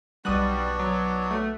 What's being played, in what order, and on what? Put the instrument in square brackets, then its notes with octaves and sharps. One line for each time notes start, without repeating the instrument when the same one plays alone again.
[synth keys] B1 D#6 F#6 [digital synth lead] G3 [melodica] B3 D4 F#4
[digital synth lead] F#3
A3